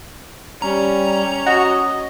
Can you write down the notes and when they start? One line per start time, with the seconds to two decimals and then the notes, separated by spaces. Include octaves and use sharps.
0.62 G3 C#4 A#5
1.47 F#4 D#5